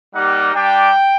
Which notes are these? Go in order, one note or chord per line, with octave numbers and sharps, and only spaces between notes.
G3 A#3 D#4 G4 F#5
G3 D4 G4 G5